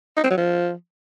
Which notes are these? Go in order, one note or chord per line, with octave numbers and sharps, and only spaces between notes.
D#4
C4
F#3
F3